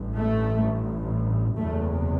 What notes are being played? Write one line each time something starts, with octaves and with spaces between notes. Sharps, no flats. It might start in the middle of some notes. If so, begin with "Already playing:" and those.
Already playing: A1 G2
A3
F#1 E2 C3 A3